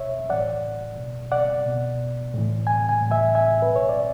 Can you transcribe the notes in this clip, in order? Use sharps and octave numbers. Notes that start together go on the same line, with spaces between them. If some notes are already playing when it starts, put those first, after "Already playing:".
Already playing: B2 C#5 E5
A2 E3 D5 F#5
B2
D5 F#5
B2
A2 E3
G#5
G#5
A2 E3
E5 G#5
E5 G#5
B4
B2
C#5
D5